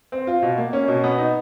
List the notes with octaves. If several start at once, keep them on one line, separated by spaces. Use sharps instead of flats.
C4
F4
B2
A#3
C#4
B2
B3
D#4